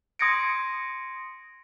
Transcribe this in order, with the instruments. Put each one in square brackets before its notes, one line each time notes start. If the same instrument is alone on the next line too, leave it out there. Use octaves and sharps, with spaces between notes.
[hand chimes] C6 D#6 G#6 A#6 C#7 D7